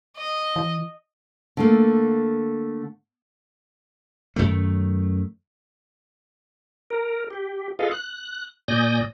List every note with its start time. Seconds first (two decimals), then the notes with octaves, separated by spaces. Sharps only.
0.17 D#5
0.56 E3
1.57 D3 A3 A#3
4.36 F#2 D#3 A3
6.90 A#4
7.30 G4
7.79 F4 G#4 A4 B4 D#5 F5
7.91 F#6
8.68 A#2 D5 G#5 D#6 G6 A#6